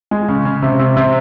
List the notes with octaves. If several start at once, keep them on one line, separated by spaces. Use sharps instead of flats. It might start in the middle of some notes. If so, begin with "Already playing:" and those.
G#3
C#3
C#3
C3
C3
C3